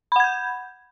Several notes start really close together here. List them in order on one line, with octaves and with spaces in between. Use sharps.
B5 F#5 G#6 G6